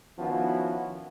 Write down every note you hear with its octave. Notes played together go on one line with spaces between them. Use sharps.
D#3 F3 B3 C#4 E4 F#4